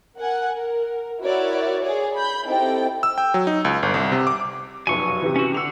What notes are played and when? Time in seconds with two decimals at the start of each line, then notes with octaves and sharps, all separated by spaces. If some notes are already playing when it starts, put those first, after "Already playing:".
0.17 A#4 F#5 G#5
0.53 A#4
1.21 E4 F#4 A#4 C#5 D5 E5
1.83 G#4 C#5 D5
2.15 B5 G6
2.47 C4 D#4 E4 G4 A4 G5
3.03 E6
3.18 G5
3.34 F#3
3.47 D#4
3.65 C#2
3.83 G1
3.94 C2
4.12 C3
4.27 D6
4.87 F1 B1 F#2 G#5 C#6
5.22 C3 E3
5.36 C#4 F#4
5.54 D3 F#5 E6 F7